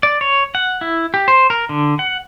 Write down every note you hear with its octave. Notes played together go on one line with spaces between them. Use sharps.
D5
C#5
F#5
E4
G4
C5
A#4
D3
F#5